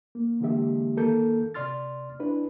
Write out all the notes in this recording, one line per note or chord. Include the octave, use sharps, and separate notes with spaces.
A#3
D3 E3 G#3 A#3 G4 E5
D#3 A#3 A4 A#4 G6
C3 D5 C6 F6 A6
D4 E4 B4